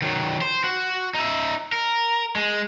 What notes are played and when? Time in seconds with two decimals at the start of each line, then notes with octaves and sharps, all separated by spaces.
0.02 D#3 F#3
0.41 C5
0.64 F#4
1.15 D#4 E5
1.72 A#4
2.36 G#3